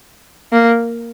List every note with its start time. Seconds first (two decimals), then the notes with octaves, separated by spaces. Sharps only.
0.52 A#3